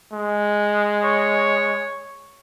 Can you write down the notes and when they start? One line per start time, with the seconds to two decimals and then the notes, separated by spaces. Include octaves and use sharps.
0.13 G#3
1.04 C#5